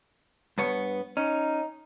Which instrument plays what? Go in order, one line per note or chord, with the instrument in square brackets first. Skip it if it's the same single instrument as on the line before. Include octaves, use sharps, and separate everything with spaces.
[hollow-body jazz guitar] G2 B3 C#5
[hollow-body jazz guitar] C#4 [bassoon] D#4